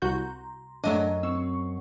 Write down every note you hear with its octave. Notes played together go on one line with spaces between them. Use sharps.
C2 F#4 A#5 C6 G6
F#2 F#3 A3 D4 D#5 F#5 A5 A#5
C4 C#6 E6